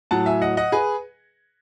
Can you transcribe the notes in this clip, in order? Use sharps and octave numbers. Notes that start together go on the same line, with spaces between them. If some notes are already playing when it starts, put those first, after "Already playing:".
A2 F#3 F#5 A5
E5 G#5
D#5 F#5
D#5 F#5
G#4 B4